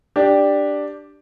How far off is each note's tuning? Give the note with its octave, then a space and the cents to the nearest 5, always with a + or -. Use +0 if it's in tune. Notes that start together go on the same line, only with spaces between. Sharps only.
D4 +0 G4 +0 D5 +0